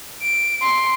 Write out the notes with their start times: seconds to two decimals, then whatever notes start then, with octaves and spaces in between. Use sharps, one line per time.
0.22 D7
0.62 C6